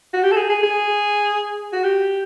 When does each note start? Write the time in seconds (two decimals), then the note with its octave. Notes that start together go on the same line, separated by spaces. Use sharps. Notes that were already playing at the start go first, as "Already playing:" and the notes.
0.13 F#4
0.23 G4
0.32 A4
0.36 G#4
0.49 G#4
0.63 G#4
1.73 F#4
1.84 G4